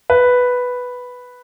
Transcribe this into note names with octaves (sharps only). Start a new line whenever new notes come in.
B4